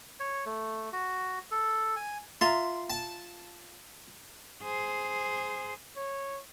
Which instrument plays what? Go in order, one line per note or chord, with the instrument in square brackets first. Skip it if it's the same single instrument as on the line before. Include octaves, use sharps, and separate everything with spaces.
[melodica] C#5
A3
F#4
A4
G#5
[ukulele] F4 E5 A#5 [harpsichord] C6
[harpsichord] A5
[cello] G#4 C5
[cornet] C#5